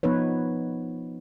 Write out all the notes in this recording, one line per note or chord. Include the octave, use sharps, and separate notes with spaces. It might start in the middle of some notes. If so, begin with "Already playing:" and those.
F3 B3 D#4 B4 C#5